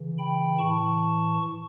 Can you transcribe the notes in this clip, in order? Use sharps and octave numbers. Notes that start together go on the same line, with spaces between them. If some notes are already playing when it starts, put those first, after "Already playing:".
Already playing: C#3 E3
G5 B5
A2 E3 A5 C#6